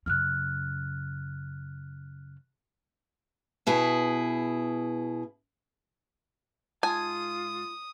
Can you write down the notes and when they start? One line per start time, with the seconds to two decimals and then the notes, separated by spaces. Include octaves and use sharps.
0.06 F#2 C#3 F6 F#6
3.67 B2 E4 G#4
6.83 G#2 F4 G#5 A5 D#6